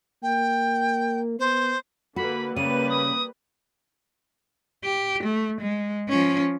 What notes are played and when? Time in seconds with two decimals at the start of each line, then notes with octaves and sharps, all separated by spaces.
0.23 A#3 G5
1.39 B3 C5
2.16 D3 A#3 F#4 B4 B5
2.56 C#3 G3 A#3 B4 D#7
2.90 D#6
4.84 G4
5.23 A3
5.61 G#3
6.09 F3 C#4